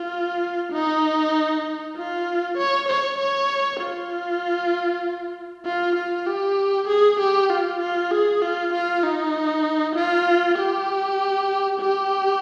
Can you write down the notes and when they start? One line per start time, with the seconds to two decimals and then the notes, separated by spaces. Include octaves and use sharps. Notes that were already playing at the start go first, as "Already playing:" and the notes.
Already playing: F4
0.73 D#4
1.97 F4
2.58 C#5
2.88 C#5
3.19 C#5
3.81 F4
5.65 F4
5.96 F4
6.26 G4
6.88 G#4
7.20 G4
7.50 F4
7.81 F4
8.11 G#4
8.42 F4
8.73 F4
9.04 D#4
9.96 F4
10.58 G4
11.80 G4